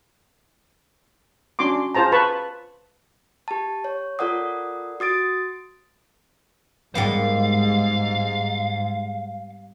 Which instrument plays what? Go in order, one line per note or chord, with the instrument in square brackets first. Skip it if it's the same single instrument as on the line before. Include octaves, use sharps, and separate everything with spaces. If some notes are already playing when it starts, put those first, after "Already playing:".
[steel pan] C#4 D4 F#4 C6 D6
F4 G#4 C5 A5 A#5
B4 A5 B5 C#6
[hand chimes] G4 A5
C#5
F4 A4 A#4 D5 F#5 D#6
F#4 D#6 A6 D7
[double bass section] G#2 [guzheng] G3 A#3 B3 [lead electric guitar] F5